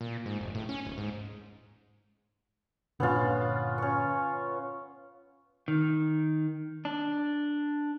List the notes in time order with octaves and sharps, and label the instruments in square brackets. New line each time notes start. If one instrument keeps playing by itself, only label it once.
[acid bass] A#2
G#2
F1
A2
C#4
D#1
G#2
[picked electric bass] G1 A#2 D3 [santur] B3 C#4 F4
[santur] C#4 C#6
[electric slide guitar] D#3
D4